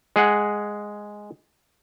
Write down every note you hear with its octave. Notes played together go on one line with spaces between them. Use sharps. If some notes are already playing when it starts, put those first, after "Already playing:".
G#3 G#4 F#5